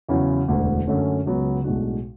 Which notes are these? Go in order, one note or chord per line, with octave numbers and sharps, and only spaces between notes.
E2 C#3 F#3 C#4 E4
E1 D2 D3
F#2 D3 A3 C#4
C#2 C#3 F#3 B3
B1 A2 G#3 D4 F#4